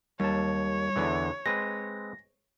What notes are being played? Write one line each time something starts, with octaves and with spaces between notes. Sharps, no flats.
D#2 G3 C#5 A5
E2 D3 E3
G#3 C4 B4 A#6